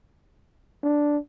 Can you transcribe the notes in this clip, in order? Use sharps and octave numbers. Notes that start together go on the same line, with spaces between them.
D4